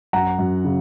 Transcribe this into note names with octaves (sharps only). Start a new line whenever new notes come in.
F#2 F#5 A#5
F#2
C#3